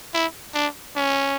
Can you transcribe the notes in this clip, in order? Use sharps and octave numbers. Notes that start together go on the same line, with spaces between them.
E4
D4
C#4